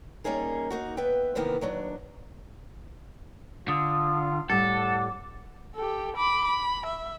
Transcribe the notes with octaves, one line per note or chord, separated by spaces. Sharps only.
G3 A#3 C#4 D#4 G#4 A#4
A#3 D#4 F#4
B3 B4 E5 G5
C3 D#3 E3 A#3 B3
D#2 F#3 D4
D3 F4 D#6
A2 G3 A4 F#5 D6
G4 A4
B5 D6
B5
E5